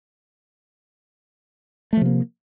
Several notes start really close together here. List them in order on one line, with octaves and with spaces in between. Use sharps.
A3 F3 C3 A#3